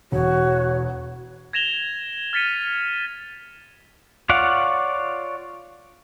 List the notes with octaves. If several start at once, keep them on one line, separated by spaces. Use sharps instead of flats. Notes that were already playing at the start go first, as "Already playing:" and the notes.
E1 F#4 C#5
G#6 A#6 E7 F7 G7
F6 A6 B6 C#7 D#7
F4 C#5 D5 F5 F#5